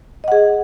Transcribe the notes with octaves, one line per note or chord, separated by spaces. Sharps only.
G#4 D#5 F#5